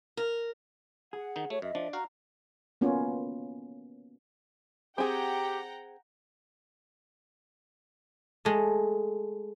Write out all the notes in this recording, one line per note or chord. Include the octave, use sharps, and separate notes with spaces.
A#4
G#4 F#5
D#3 D#4
A3 F#4 C#5
F#2 D#5 E5
F3 D4
F#4 F5 A#5
A#3 B3 C#4 F4
C4 G4 G#4 F#5 G5 A#5
G#3 A3